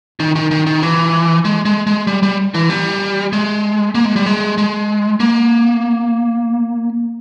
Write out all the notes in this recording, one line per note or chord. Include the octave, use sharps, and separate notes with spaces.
D#3
D#3
D#3
D#3
E3
G#3
G#3
G#3
G3
G3
E3
G3
G#3
A#3
G#3
G3
G#3
G#3
A#3